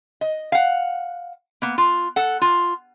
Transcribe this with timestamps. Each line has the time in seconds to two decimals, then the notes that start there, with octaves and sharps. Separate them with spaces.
0.21 D#5
0.52 F5 F#5
1.62 A#3 B3
1.78 F4
2.16 A4 F#5
2.41 F4